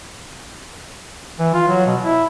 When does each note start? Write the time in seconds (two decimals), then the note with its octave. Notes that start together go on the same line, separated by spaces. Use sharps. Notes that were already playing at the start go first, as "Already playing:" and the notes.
1.39 E3
1.54 F4
1.68 F#3
1.86 B2
2.03 E4